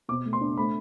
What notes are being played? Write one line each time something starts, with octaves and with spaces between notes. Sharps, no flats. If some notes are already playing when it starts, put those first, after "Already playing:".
B2 D6
A3
C6
D4
A3 B5